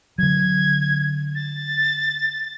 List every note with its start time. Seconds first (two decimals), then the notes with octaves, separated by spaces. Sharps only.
0.18 D3 F#3 G#6
1.35 A6